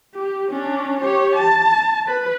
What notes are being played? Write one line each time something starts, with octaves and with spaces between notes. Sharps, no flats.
G4
C#4 D4
G4 C#5
A5
B4